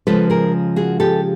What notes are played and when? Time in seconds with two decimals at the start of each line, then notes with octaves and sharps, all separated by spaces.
0.07 C#3 F3 G#3 A4 B4
0.30 G#4 A#4
0.76 F#4 G#4
1.00 G4 A4